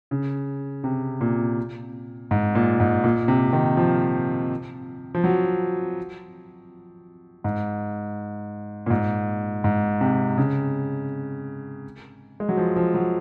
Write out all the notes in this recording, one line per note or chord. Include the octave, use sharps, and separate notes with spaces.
C#3
C3
A#2
G#2
A#2
G#2
A#2
C3
D#3
F3
F3
F#3
G#2
A#2
G#2
G#2
C3
C#3
G#3
F#3
F3
F3
F#3